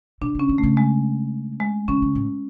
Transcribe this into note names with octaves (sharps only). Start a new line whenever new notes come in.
B2 D4
C#3 C#4
D3
A3
C#3
G#3
G#3
D3 C#4
C#3
A2